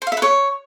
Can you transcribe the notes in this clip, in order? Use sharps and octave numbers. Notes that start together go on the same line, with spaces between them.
C5
F5
E5
B4
C#5